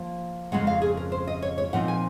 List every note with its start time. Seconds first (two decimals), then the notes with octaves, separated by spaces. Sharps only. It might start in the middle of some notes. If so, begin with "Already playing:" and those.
Already playing: F3 A#3
0.52 F2 C#3 G#3 C#4 F#5
0.67 F5
0.82 G#4
0.97 A#4
1.12 C5
1.27 D#5
1.42 C#5
1.58 C#5
1.73 A#2 F3 C4 D#4 F#5
1.88 G#5